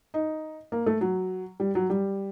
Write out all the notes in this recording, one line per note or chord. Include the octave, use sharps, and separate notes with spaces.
D#4
A#3
A3
F#3
G3
F#3
G3